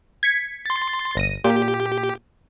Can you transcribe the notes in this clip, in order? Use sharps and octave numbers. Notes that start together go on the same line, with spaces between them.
G#6 B6 C#7
C6 A6
G1 A#6 D#7
A#2 G4